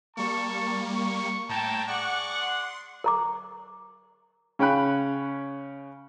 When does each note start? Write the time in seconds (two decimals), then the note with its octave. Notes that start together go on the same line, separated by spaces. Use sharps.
0.17 G3 A#3 A5 C#6
0.95 C#6
1.49 A2 G5 A5 A#5 G#6
1.88 G#4 D5 F#5 C#6 D6
2.41 C6
3.04 A#4 A#5 D6
4.59 C#3 C#4 G5 B5 F#6